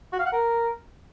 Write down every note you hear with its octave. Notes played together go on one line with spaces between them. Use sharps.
F#4
F5
F#5
A#4